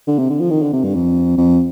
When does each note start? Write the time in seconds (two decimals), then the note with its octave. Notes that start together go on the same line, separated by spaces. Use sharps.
0.07 D3
0.19 C3
0.30 D3
0.40 F3
0.50 D#3
0.62 D3
0.73 C3
0.84 G2
0.94 F2
1.38 F2